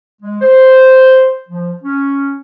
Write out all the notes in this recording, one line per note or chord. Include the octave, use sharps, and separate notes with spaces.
G#3
C5
F3
C#4